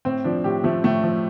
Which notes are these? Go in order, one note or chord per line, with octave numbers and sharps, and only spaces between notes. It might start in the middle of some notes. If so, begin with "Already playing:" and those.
A2 C4
F3 D4
A2 G4
F3 A3
A2 A3
F3